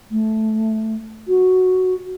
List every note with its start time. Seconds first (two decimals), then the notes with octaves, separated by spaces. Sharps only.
0.11 A3
1.28 F#4